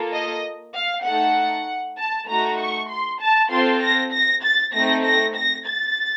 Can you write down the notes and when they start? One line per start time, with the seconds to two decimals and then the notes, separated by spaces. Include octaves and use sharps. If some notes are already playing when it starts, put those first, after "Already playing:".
Already playing: A#3 F4 A4
0.13 D#5
0.75 F5
1.05 A3 D#4 A4 F#5
1.98 A5
2.28 A3 D#4 F#4 A#5
2.59 C#6
2.89 C6
3.21 A5
3.51 C4 F4 A4 C6
3.81 A#6
4.13 A#6
4.43 A6
4.74 A3 C4 D#4 A4 A#6
5.04 A#6
5.36 A#6
5.66 A6